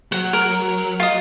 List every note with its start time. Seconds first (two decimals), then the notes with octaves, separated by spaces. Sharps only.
0.12 F#3 F#5
0.33 A#4
1.00 F4 D#5